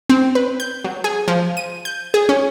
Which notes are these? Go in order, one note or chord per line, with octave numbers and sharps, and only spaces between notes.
C4
B4
G6
F#3
G#4
F3
D#7
G6
G#4
C#4